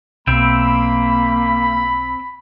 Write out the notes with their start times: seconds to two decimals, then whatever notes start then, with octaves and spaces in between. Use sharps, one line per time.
0.27 B1 A#3 C4 E5 G5 B5